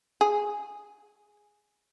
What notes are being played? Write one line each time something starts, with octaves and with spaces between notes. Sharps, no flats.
G#4